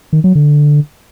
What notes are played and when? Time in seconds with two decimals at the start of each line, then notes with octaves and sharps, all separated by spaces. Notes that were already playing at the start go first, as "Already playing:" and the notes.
0.13 D#3
0.24 F#3
0.35 D3